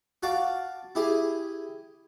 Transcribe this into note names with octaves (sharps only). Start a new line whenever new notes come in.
F#4 F5 A5 D6
E4 G4 G#4